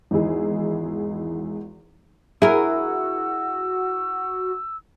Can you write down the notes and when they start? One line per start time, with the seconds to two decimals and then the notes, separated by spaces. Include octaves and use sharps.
0.11 G#1 E2 D#4 E4 G#4
2.42 E4 F#4 G#4 A#4 E6